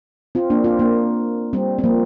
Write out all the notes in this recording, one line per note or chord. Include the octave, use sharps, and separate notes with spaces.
C4 F4
A#3 D4
C4 F4
A#3 D4
G3 C4
C4
F3 A#3